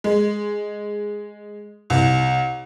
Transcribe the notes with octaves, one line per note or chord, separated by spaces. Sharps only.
G#3
C2